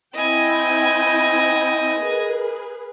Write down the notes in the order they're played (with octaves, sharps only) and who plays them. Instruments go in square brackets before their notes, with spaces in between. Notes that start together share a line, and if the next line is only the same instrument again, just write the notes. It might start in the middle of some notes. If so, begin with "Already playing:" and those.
[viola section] C4 E4 G5 [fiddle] D#5 G#5
[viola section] G#4 A#4 B4